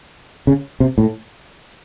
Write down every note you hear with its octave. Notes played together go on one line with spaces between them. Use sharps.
C#3
C3
A2